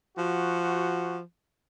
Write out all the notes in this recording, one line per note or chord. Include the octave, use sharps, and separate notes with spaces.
F3 F#4